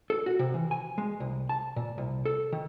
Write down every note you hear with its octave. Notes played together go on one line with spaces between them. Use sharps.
A4
F#4
C3
E3
G#5
G#3
C2
A5
A#2
C2
A4
D#3